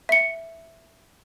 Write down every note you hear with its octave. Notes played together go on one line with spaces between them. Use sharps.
E5 C#7